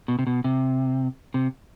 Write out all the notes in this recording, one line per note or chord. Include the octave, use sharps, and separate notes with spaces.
B2
C3
B2
C3
C3